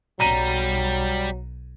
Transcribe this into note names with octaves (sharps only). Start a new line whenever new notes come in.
B1 F#3 G3 A#5 D#7